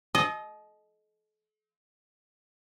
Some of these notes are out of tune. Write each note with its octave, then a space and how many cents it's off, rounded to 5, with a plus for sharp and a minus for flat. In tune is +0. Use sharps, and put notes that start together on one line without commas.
A4 -40 D#5 +0